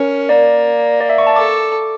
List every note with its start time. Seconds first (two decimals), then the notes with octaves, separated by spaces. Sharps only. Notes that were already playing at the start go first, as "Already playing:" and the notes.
Already playing: C#4 A#4
0.29 A#3 D5
1.00 D5
1.10 E5
1.18 C#6
1.27 A5
1.36 A4 D6